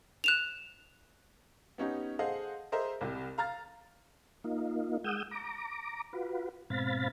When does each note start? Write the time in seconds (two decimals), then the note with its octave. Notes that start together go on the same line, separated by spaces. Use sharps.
0.24 F#6 E7 F7
1.78 B3 C#4 D#4 G4
2.19 G#4 A4 C5 D#5 F5 F#5
2.72 G#4 A#4 C5 D#5 E5
3.01 C2 C3
3.38 F5 A#5 F6 A6
4.44 A#3 D#4 F4
5.04 G#3 F#5 D#6 E6 G6
5.31 A#5 D6
6.13 F4 F#4 B4
6.70 G#2 B2 C4 F5 B5 A6